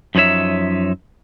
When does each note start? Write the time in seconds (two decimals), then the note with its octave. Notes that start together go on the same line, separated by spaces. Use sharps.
0.15 F#2 F3 D#4 C#5 E5